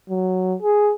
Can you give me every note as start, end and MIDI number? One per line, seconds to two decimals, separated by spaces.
0.10 0.55 54
0.63 0.92 68